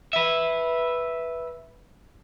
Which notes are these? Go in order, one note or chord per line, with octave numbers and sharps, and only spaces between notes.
B4 E5